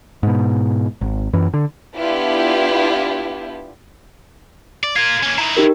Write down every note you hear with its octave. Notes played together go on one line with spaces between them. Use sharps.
G#2 B2
G#1
F#2 E3
D3
B3 D4 E4 F4 G4
D5
F4 A#4 G#6
A#3 C#4
D#3 E4 A#5
D#4 G4 A#4